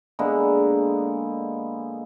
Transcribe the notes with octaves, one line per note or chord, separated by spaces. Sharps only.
D3 G#3 A#3 B3